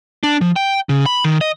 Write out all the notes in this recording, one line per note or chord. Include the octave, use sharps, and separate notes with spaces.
D4
F3
G5
C#3
B5
D#3
D#5